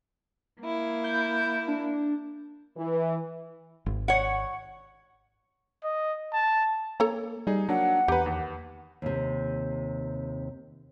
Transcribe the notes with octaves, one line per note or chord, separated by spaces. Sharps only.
A#3 E4
G6
D4
E3
G#1
C#5 F#5
D#5
A5
A#3 A4 C#5 A#5
G3 D#4 G#4
F#3 A#3 D4 F#5
E2 G4 B4 A#5 G6
D#2
D#2 C3